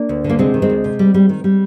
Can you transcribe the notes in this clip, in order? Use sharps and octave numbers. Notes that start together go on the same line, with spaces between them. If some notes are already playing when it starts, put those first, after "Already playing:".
Already playing: A#3 D4
D2
D3
A#3
C3 G#3 C4
D#3
G#3 C4
D2
C3
G3
G3
D#3
G3